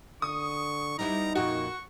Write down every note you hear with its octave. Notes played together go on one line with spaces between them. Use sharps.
D3 C#6 D#6
G3 B3 D#4 E4 A#5
F2 A#2 F#4 C#6